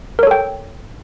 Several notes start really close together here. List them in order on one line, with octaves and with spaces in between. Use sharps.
A#4 C#5 A4 G5